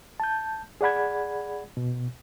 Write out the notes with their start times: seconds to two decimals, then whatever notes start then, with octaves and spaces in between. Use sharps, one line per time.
0.20 A5 G6
0.81 G#4 D5 F#5 B5 G#6
1.77 B2